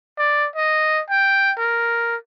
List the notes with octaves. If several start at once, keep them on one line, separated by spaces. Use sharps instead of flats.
D5
D#5
G5
A#4